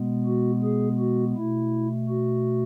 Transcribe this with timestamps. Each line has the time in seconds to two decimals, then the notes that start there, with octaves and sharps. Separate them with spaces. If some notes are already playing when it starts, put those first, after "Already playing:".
Already playing: B2 G#3 B3
0.26 F#4
0.63 G#4
0.99 F#4
1.36 B2 A3 E4
2.08 F#4